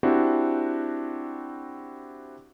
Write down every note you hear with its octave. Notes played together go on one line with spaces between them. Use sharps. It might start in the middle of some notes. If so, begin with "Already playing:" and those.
C4 D4 E4 F#4 G4